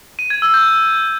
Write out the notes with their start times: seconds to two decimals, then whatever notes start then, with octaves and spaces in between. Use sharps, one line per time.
0.19 D#7
0.30 G#6
0.42 E6
0.54 G6